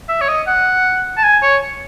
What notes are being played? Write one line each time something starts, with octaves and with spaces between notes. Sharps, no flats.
E5
C#5
D#5
F#5
A5
G#5
C#5